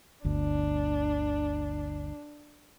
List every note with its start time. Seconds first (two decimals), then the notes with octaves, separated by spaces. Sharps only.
0.25 G1 D2 D4